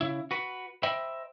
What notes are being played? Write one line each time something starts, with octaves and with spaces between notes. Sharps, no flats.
C#3 E4
F#4 B4
C5 D#5 E5 G5 B5